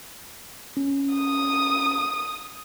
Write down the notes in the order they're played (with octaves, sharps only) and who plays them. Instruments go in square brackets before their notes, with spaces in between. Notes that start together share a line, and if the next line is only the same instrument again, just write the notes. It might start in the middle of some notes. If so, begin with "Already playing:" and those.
[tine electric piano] C#4
[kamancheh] D#6